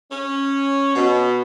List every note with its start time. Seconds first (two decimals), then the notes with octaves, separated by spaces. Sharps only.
0.11 C#4
0.95 B2